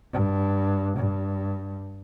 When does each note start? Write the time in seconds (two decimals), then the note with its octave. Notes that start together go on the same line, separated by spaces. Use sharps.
0.12 G2
0.96 G2